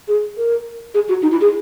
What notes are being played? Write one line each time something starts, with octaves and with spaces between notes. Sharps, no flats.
G#4
A#4
G#4
F#4
D#4
E4
G#4